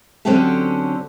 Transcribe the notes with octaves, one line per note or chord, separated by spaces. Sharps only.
D3 F#3 C4 C#4 G4 A4